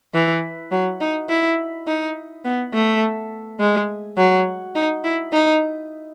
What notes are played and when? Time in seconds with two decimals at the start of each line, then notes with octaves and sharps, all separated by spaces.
0.14 E3
0.72 F#3
1.01 D#4
1.29 E4
1.87 D#4
2.45 B3
2.73 A3
3.60 G#3
4.17 F#3
4.75 D#4
5.04 E4
5.32 D#4